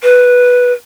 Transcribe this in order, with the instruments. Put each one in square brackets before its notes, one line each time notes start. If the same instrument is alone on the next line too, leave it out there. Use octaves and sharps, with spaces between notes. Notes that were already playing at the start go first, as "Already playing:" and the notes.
[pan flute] B4